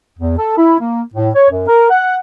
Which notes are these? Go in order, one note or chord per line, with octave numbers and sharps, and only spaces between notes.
E2
A4
E4
A#3
A2
C#5
F#2
A#4
F#5